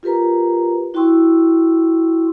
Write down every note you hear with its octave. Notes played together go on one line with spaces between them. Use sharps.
F4 G4 A#4 B4 A#5
E4 F#4 G5 C6 C#6 E6